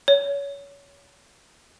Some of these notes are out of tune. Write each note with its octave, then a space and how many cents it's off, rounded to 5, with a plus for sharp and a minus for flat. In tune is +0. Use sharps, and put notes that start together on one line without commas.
C#5 +25